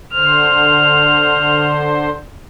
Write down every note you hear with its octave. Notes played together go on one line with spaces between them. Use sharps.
D3 C5 F6